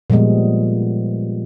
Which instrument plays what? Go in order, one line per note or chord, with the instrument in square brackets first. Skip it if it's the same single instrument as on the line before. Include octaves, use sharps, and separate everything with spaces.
[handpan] A#2 F3 G3 G#3 B3